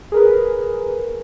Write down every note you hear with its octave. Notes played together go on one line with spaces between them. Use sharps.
G#4 A#4 B4